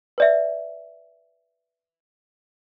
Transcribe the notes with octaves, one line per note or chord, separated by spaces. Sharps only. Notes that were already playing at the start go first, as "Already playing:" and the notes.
B4 D5 E5